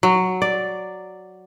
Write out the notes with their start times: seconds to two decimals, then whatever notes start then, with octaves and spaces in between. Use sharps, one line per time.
0.03 F#3
0.42 D5